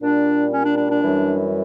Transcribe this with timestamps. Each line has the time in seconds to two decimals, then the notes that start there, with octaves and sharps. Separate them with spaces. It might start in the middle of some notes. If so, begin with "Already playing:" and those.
0.02 A#2 G3 D4
0.53 C#4
0.65 D4
0.77 D4
0.90 D4
1.03 F#2 E3 G3